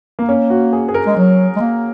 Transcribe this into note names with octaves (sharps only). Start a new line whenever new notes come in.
A#3
A#3 C#4
F#4
G#4
G#4
A#4
G#3
F#3
G#3
A#3